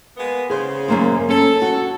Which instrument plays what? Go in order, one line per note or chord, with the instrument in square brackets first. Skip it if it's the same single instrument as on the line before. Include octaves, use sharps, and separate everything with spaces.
[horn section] G#3 A#3 B3
[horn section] C#3 [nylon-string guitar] G#4 C5
[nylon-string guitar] F#2 A#3 C5
[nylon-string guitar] C#4 [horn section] A4
[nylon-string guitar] F#4